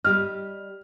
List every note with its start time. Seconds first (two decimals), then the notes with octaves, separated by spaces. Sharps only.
0.05 G3 G4 D#5 F6